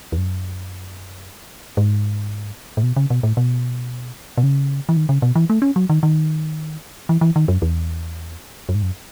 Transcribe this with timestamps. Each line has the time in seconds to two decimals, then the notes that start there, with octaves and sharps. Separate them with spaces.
0.12 E2
0.18 F#2
1.77 G#2
2.77 A2
2.83 B2
2.96 C#3
3.10 B2
3.23 A2
3.37 B2
4.38 B2
4.43 C#3
4.89 E3
4.97 D#3
5.09 C#3
5.22 B2
5.36 E3
5.50 A3
5.62 C#4
5.76 F#3
5.90 D#3
6.03 D#3
7.09 E3
7.21 E3
7.36 D#3
7.48 F#2
7.62 E2
8.69 F#2
8.75 G#2
8.82 F#2